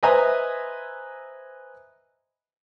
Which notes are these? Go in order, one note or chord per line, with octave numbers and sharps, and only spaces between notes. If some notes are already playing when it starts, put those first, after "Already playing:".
B4 C5 D#5 E5 G#5 A#5